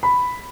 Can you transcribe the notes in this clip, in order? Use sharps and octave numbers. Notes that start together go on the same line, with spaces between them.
B5